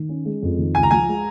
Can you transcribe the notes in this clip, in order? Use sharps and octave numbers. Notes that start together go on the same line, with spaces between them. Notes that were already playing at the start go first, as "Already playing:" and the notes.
Already playing: D#3
C#4
G#3
F2
D#3
C#2 G#5
A#5
F3 G#5
G#3